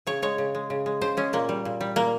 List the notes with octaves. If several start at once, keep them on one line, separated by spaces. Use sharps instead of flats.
C#3 C#5
G#3 C#5
C#3
G#3
C#3
G#3
C#3 C5
G#3 C#4
A#2 A#3
G3
A#2
G3
A#2 A#3